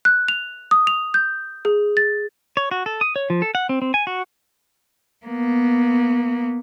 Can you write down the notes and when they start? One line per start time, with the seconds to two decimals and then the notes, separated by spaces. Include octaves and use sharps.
0.05 F#6
0.28 F7
0.71 D#6
0.87 F7
1.14 G6
1.65 G#4
1.97 A6
2.57 C#5
2.71 F#4
2.86 A4
3.01 D#6
3.16 C#5
3.30 F3
3.42 A4
3.55 F#5
3.69 C4
3.82 C4
3.94 G#5
4.07 F#4
5.26 A#3 B3